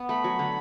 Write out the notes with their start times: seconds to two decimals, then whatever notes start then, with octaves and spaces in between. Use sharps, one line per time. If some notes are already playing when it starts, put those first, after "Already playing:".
Already playing: B3
0.09 A3 B5
0.24 F#3
0.39 D3